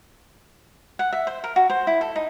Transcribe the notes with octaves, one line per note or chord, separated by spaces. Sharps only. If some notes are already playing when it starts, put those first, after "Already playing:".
F#5
E5
C5
A#4
F#4
C5
E4
A4
D#4